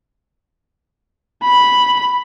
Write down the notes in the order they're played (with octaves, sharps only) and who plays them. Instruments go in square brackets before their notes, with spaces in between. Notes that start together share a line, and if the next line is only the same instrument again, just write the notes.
[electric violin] B5